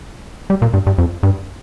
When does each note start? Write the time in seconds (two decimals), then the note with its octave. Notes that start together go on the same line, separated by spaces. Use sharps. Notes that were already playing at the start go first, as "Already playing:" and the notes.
0.50 G3
0.62 A#2
0.74 G2
0.87 G2
0.98 F2
1.23 G2